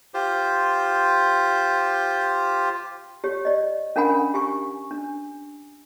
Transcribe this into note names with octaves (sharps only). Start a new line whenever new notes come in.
F4 G4 C5
G4 C#5
D5 D#5
C#4 D4 A#4 F#5 G#5 B5
G4 G#5 C#6
D4